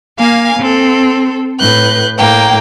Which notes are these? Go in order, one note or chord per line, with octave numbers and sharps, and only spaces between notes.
A#3 F5 G#5
C4 A4
A2 B4 F#6 G6
A2 A#3 G5